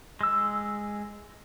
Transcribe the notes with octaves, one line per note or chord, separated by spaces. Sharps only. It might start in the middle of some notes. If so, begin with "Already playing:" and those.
G#3 E6